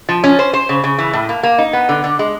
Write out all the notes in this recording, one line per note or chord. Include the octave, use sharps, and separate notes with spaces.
F3
C#4
C5
C5
C#3
C#3
E3
A2
A#3
A#3
D#4
B3
D3
D3
G#3